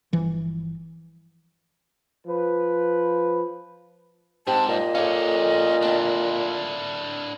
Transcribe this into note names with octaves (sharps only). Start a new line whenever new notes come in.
G1 E3 F3
F3 B4
G#2 C4 G4 A5
A#2 D#5
C#4 G4 A4 C#5 F5
D3 C4 D4 E4 A5